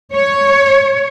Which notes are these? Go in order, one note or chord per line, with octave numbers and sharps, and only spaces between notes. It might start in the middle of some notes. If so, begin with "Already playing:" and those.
C#5